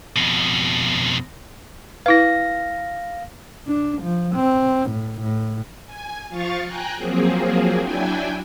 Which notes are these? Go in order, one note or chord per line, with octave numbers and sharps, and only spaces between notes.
F2 B2
E4 B4 F5 A#6
D4
F3
C4
A2
A2
G#5
F3 F4 F5 C#6 A6
G5 G#5 A#5 F#6
F3 F#3 A#3 C4 G#4
F#3 D4 E4 G5 G#5